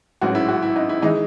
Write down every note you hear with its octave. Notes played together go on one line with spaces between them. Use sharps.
A1 G#2 F#3 C#4 F#4
E4
F#4
E4
D#4
E4
E3 G#3 D#4